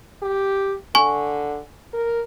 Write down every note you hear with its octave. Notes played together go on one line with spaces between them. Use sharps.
G4
D3 G#5 C#6
A#4